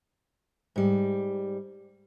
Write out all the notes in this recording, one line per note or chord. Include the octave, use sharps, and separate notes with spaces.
G#2 G3